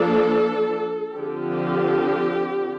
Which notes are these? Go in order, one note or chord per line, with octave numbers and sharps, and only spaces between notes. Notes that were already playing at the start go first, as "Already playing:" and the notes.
Already playing: F3 A#3 D4 A4
D3 F3 C4 G4